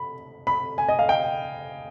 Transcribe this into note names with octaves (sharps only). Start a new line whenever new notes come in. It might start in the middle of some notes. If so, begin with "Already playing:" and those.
Already playing: B5
B5
G#5
D#5
F5
G5